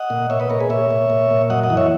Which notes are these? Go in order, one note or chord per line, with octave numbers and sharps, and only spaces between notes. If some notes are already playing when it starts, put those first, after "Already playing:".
Already playing: D#5 F#5
A#2
A#2 C#5 E5
B4 D#5
A#2 A#4 C#5
G#4 B4
A#2 C#5 E5
A#2
A#2
A#2
F#2 D#5 F#5
D#5 F#5
E3
C#5 E5